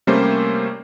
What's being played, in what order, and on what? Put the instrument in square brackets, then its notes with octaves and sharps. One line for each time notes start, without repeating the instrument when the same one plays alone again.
[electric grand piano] C3 G3 A3 A#3 C#4 C5